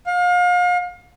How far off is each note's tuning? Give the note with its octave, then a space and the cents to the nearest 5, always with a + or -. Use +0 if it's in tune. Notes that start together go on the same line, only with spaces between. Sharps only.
F5 +35